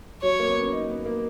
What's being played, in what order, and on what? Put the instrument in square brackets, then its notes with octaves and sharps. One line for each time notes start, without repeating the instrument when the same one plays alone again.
[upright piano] F#3 [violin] C#5
[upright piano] A#3
B3
C#4
D#4
B3
A#3